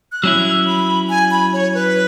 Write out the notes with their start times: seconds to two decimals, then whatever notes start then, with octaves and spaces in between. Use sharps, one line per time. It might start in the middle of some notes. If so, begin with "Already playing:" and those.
0.12 F#6
0.23 F#3 C#4 E4 E6
0.67 B5
1.09 G#5
1.31 B5
1.53 C#5
1.74 B4